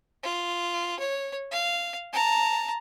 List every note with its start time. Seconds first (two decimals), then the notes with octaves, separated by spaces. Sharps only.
0.23 F4
0.99 C#5
1.52 F5
2.13 A5 A#5